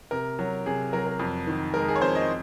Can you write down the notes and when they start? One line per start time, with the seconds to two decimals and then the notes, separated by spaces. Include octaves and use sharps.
0.11 C3 A#4
0.39 F#3
0.66 C3 G#4
0.93 F#3 A#4
1.07 A#4
1.19 F2
1.47 D#3
1.74 G#3 A#4
1.88 G#4
1.96 C#5
2.01 F2 C5
2.15 D#5